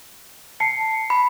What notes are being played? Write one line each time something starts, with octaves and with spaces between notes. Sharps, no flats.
A5 C7 C#7
B5